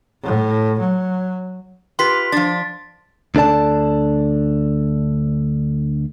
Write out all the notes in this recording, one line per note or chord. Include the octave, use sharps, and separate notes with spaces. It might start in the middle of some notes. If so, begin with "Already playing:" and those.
A2
F#3
F4 G4 B4 C6 B6
F3 D4 A6
D2 D4 A4 D5 A5